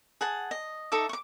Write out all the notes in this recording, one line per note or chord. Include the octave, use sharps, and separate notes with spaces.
G#4 F#5 A5
D#5
D#4 A4 E5 D6
C#6 D6